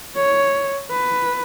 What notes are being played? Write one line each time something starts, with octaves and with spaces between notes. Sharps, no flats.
C#5
B4